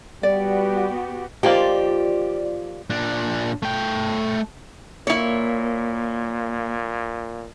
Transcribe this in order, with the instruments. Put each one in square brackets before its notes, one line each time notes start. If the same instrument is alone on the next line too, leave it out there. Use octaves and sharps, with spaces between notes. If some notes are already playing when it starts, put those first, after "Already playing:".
[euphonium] G3 [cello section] B3 F#4 G4 [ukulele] D5
[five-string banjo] D#3 F3 A#3 [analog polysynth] F4 D5 [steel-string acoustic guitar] G4
[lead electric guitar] A#2 D4
A3 G5
[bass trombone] A#2 [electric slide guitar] A#3 [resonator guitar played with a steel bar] E4 C#5